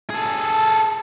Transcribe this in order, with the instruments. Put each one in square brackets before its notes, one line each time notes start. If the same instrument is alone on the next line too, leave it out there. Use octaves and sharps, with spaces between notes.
[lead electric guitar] G#4 A4